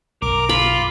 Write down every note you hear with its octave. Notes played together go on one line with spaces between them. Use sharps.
B1 F#2 A#4 D6
F4 B5